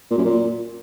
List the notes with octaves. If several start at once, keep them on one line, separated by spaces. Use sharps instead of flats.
A#2
F#2
A#2